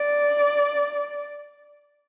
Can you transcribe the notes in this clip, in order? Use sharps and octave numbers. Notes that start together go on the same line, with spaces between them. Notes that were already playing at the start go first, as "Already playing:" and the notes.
Already playing: D5